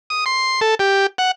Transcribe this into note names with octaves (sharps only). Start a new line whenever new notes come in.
D#6
C6
A4
G4
F#5